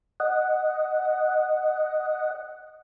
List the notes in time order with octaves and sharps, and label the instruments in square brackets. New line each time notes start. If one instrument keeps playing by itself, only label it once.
[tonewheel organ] D#5 F#5